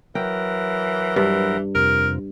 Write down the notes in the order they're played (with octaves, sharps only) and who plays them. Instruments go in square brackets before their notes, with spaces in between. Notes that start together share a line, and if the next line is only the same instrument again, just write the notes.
[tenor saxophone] E3 [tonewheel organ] F#3 A#4 [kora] G5
[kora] G2 [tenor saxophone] E3
[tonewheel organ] F2 C3 [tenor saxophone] A#4